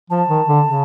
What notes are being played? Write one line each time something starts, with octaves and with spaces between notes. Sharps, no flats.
F3 A5
D#3
D3
C#3